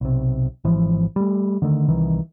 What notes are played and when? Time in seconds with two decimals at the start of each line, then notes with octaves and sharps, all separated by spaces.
0.01 B1 C3
0.64 G#1 E3 F3
1.16 G3 A3
1.62 D3 D#3 A3
1.88 C2 D#3 E3